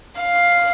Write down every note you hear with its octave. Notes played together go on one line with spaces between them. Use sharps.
F5